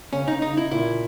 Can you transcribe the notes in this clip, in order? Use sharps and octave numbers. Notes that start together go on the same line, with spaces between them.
C#3 C#4
D#4
C#3 D#4
E4
A#2 E4